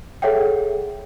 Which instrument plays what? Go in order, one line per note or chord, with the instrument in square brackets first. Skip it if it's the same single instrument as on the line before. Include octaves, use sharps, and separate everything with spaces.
[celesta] G#4 A4 C#5 E5 F#5 G5